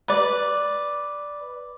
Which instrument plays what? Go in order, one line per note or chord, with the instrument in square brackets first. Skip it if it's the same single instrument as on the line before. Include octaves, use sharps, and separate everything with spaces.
[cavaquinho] B4 D5